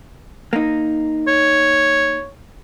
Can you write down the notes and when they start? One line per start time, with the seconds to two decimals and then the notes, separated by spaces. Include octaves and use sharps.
0.53 A#3 D#4
1.28 C#5